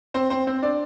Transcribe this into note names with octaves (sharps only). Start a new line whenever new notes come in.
C4 C5
C4 C5
C4 C5
D4 D5